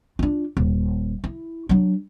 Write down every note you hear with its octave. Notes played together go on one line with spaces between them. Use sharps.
D4 F4
D#1
E4
F#3 D4